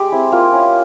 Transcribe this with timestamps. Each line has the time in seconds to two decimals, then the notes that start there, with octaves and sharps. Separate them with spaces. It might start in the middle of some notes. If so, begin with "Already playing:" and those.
Already playing: G#3 G4
0.12 C4 E4
0.32 A#3 F4
0.53 C#4 E4